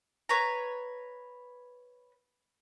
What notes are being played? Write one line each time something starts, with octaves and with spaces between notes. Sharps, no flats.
B4 C#5 A#5